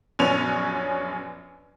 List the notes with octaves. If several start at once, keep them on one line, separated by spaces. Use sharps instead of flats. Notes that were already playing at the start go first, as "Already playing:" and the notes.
A#1 F#2 B3 C#4 G#5 F7